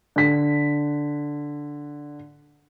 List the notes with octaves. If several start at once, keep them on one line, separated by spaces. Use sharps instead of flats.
D3 B6